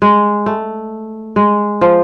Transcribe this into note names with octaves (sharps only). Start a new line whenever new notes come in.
G#3
A3
G#3
F3